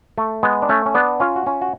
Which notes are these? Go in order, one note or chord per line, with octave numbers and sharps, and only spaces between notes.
A3
G#3 B3
D4
A3 C#4
C#4
B3 D4
C#4 F4
F#4
C#4 F4
F#4